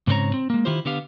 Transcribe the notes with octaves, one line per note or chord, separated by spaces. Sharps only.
G#2 C#3 C4 C5 C#5 A#5
C4
G#3 A#3
D#3 E4 F4 G4 C5
D3 B3 G4 F5